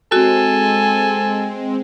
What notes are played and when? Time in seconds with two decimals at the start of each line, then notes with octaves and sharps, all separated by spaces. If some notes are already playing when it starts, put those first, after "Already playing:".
0.12 G#3 C4 F#4 A4 G#5